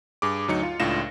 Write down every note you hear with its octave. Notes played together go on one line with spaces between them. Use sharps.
G2 G#4 D6
D2 F#3 D#4 C#7
F4
C#2 A2 D4 F4 A#6 E7